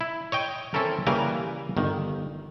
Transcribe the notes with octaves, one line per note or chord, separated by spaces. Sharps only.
E4
C#5 D#5 G5
C4 C#4 E4 A4 A#4
C#3 E3 G3 A#3 A#4 B4
G1 D#3